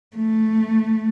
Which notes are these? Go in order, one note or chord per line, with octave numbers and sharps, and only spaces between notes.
A3